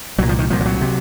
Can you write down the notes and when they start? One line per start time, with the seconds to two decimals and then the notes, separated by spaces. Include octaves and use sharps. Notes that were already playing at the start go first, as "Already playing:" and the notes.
0.18 C2 F#3
0.22 A#2
0.29 F3
0.39 D#3
0.50 C2 A#2 F3
0.61 F3
0.66 F#3
0.81 C3